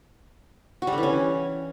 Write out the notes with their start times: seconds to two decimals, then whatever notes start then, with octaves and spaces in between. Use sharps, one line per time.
0.82 F#4
0.87 G3
0.92 D3
0.98 E3
1.03 C#4